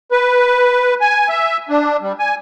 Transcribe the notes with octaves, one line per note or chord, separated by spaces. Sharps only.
B4
G#5
E5
D4
G3
G#5